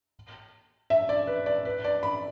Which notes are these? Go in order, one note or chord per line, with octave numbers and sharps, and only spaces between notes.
E5
D5
B4
D5
B4
D5
B5